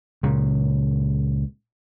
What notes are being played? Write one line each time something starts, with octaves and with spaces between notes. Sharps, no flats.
C#2 A#2 C#3